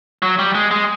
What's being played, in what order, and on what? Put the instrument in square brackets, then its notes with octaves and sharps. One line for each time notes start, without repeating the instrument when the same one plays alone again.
[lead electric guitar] F#3
G3
G#3
G#3